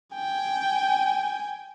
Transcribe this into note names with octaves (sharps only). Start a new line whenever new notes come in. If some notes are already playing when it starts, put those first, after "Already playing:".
G5 G#5